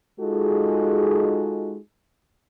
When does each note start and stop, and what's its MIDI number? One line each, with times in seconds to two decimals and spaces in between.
0.20 1.77 56
0.20 1.77 63
0.20 1.77 65
0.20 1.77 66
0.20 1.77 68
0.20 1.77 69